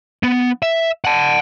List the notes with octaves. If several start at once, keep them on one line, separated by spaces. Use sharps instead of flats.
B3
E5
F#5 A5